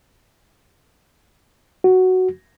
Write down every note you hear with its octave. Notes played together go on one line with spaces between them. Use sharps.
F#4